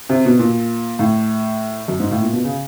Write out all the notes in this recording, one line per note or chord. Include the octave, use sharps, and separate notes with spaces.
C3
B2
A#2
A2
F#2
G#2
A2
A#2
B2
C#3